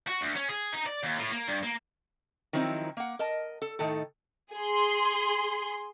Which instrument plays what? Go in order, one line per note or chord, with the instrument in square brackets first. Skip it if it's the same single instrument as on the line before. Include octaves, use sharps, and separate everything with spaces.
[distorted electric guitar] F#4
D2
C#4
G#4
D#4
D5
D#2
A2
A#3
G2
A#3
[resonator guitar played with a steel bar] D#3 F3 F#3 C4 D#4 E4
A#3 F#5
A#4 D#5 A5
A4
A2 D#3 D#4 A4
[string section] G#4 C6